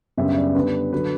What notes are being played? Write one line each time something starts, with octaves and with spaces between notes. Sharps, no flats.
F#2 C#3 G3 B3 D4 E5
E5
D5
D3 G3 B3 D4 B4
D3 F#3 B4